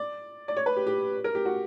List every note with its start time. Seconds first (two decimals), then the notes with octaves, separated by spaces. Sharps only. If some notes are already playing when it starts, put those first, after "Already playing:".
Already playing: D5
0.48 D5
0.57 C#5
0.66 B4
0.77 G4
0.87 G4
1.24 A#4
1.35 G4
1.45 F#4